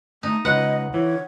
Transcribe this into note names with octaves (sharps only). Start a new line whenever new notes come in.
A3 D#4
C#2 B4 D#5 F#5
E3 C#5